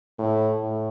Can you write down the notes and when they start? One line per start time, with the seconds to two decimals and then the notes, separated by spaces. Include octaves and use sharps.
0.19 A2
0.61 A2